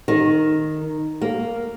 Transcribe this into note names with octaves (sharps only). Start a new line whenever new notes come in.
D#3
A#3